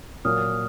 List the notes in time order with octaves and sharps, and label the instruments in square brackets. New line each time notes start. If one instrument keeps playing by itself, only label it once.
[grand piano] A#2 F#3 A#3 [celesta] D#6 F6